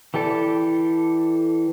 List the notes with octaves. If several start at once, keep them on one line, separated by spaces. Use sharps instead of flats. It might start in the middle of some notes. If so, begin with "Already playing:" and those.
E3 G4 A4 D5